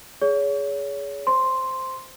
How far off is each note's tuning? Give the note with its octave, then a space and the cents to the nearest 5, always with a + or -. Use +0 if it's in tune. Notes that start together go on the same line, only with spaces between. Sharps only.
G#4 +0 C#5 +30
C5 -10 C6 +0